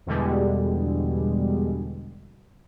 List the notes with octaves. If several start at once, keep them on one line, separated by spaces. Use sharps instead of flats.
E2 B2 D3 G3 G#3